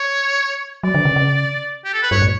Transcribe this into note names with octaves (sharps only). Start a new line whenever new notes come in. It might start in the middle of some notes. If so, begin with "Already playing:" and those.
Already playing: C#5
F#3 D5
D3
C#3
C#3
G4
A4
B4
G2 C#5
A2